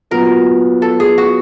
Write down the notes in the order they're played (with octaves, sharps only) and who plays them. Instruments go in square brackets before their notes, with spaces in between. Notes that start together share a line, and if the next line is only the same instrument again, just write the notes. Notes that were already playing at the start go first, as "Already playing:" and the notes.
[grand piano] A#2 F#3 B3 [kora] A#4
[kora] A4
G#4
F#4